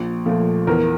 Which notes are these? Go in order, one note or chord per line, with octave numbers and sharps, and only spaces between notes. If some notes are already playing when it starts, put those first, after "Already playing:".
Already playing: A#1
A#2 F3 A3
E2 A#4